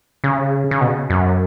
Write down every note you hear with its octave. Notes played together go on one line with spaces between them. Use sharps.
C#3
C#3
B2
F#2